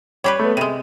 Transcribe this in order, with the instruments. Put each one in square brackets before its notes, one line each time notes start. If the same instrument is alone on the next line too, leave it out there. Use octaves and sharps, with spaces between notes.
[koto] G3 G4 B4 [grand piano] C#5
[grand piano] A3 B3
[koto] C3 G#3 [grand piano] D#7